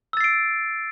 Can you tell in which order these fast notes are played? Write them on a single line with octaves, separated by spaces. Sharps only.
E6 A6 C7 D7